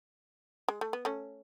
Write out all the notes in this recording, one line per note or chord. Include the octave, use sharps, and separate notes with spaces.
G#3
A3
B3
A3 C#4